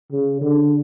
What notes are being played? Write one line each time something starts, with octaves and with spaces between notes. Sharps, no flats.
C#3
D3